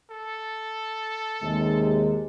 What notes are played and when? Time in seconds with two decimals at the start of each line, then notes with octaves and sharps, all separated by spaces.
0.10 A4
1.42 D#2 C3 G#3